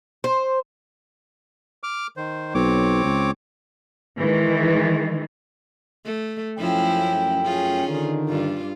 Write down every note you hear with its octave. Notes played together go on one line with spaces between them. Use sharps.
C5
D6 F6
D#3 C5
B1 C4 C#5 D6
C#2
D#3 E3 G#3
A3
F#2 F3 A3 C#4 E4 G5
C#4 F4 G#4
D3 D#3
G2 F4